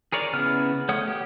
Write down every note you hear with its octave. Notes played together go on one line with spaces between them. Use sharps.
G#4 A#4 C#5 D5
C#3 B3 E4 F6
A3 C#5 F#5 D#6
G4